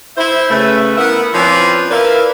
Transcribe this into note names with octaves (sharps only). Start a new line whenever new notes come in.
E4 C5 E5
C#3 A3 B4
B3 E4 A#4 E5 F#5
F3 C4 C#4 E4 B4 D5
E4 A#4 B4 D5 E5 F5